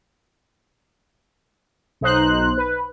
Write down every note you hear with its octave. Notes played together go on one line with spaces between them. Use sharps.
B1 D#4 C5 F#6
B4